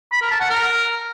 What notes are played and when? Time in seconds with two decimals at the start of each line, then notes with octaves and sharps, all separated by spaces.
0.12 B5
0.21 A#4
0.31 A5
0.40 F#5
0.50 A#4